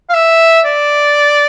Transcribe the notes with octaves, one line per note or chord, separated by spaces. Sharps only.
F5
E5
D5